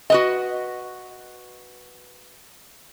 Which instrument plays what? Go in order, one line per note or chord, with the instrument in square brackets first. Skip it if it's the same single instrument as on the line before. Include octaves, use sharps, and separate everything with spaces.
[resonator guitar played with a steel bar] F#4 B4 D#5